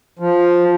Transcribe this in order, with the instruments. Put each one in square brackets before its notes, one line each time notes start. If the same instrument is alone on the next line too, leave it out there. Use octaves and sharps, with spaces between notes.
[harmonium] F3